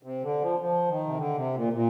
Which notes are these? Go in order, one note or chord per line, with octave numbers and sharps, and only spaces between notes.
C3
D3
F3
F3
D#3
C3
D3
C3
A#2
A#2